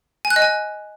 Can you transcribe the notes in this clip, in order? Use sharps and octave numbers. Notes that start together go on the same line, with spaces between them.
G#5
F#6
D#5
G#5